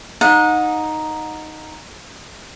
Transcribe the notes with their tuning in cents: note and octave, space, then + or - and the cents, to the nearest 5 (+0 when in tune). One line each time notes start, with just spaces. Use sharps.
D#4 +0 F#5 -30